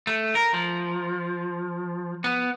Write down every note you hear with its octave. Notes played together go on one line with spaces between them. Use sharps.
A3
A#4
F3
B3